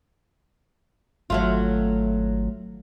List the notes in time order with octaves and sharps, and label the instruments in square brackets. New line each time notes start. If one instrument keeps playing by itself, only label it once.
[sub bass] G#1 [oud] F#3 A3 F4